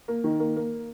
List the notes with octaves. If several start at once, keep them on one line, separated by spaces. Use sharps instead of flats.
A#3
D#3
A#3
A#3